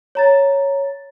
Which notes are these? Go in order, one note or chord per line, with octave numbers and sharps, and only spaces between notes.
C#5 A#5 A6